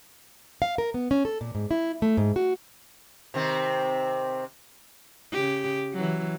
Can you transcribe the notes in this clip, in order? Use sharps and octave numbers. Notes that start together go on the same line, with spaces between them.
F5
A#4
B3
C#4
A4
A#2
G#2
E4
A3
G#2
F#4
C3 D#3 C4
C#3 G4
E3 F#3